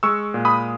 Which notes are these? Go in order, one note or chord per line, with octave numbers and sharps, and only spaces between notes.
G#3 C#6 E6
A#2
B5 D#6